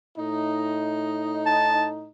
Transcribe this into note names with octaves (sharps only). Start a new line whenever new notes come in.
A2 D#4
A5